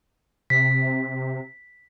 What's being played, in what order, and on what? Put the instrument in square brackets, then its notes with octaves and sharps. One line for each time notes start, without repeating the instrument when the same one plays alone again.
[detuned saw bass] C3 [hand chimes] B6